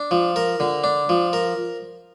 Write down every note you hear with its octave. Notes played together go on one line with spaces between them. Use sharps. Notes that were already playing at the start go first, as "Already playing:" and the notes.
Already playing: D4
F3
A#4
D3
D4
F3
A#4